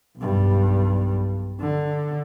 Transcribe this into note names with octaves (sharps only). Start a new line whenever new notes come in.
B1 G2
D3